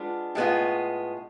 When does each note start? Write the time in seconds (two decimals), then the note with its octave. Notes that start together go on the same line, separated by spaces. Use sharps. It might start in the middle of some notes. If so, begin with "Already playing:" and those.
Already playing: G#3 B3 D4 F4
0.35 A2 G#3 B3 F4